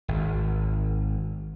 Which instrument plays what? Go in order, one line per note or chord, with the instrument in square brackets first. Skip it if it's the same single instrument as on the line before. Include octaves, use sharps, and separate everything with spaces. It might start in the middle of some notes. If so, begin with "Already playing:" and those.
[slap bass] G#1